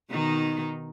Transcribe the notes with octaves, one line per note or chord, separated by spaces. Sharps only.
B2 D#3 D#4